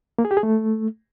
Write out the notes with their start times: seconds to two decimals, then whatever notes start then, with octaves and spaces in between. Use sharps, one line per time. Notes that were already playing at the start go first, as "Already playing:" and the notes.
0.19 A#3
0.25 G#4
0.31 G4
0.37 G#4
0.43 A3